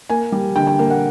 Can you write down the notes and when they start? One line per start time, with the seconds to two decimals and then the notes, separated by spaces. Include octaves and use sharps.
0.10 A#3 G#5
0.32 G3
0.56 D3 G5
0.67 G5
0.79 A#3
0.90 F#5